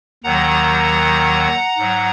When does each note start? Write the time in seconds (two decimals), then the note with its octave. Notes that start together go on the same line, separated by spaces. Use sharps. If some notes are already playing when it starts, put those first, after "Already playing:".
0.24 D#2 D#3 F#3 F#5 A#5
1.78 G#2 F#3